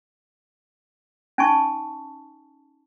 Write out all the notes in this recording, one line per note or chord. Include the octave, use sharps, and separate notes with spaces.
C#4 D#4 G#5 A5 C#6